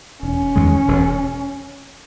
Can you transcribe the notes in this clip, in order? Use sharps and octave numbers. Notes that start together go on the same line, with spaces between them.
E1 C#4
E2 D#3 G#3
E1